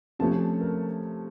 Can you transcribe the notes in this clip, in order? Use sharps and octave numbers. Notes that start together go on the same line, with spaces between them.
C3 F3 A3 C#4 A5
A#4